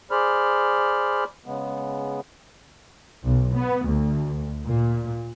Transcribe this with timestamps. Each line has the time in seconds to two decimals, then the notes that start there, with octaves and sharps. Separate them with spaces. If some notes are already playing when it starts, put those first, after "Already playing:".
0.11 G#4 C5 D5 B5 F6
1.46 C#3 G#3 B3
3.24 B1
3.55 B3
3.87 D2
4.65 A#2